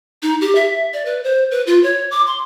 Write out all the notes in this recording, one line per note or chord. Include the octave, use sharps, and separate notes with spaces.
D#4
G4
E5
D5
B4
C5
B4
F4
C#5
D6
C6